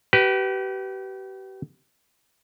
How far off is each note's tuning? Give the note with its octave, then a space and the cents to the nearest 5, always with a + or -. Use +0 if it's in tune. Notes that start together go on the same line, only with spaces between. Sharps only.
G4 -35 B4 +0